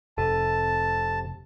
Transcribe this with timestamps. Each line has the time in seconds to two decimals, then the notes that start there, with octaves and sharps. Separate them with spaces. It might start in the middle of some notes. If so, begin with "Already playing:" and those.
0.18 F1 C3 A4 A5